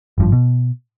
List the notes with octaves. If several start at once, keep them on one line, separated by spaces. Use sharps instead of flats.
G#1 G2 F3
B2